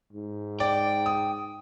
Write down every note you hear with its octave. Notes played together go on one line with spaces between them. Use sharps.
G#2
D5 G5
D#6